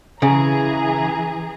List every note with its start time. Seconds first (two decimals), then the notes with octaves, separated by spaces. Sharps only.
0.22 C#3 E3 G#4 A#5